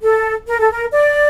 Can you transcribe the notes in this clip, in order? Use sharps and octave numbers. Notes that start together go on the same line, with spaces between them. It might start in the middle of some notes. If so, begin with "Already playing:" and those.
A4
A#4
A4
A#4
D5